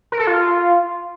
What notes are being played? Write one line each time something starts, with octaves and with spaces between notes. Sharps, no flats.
A#4
A4
F4